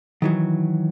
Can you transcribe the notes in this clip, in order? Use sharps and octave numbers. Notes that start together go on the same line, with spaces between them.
D#3 E3 F#3